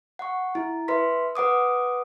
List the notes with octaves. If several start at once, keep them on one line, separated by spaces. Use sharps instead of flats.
F#5 C#6
E4
B4 E5 C6 B6
B4 F#5 D6 D#6